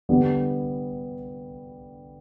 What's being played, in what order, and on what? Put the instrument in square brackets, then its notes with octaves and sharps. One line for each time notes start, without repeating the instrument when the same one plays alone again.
[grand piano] D3 G3 B3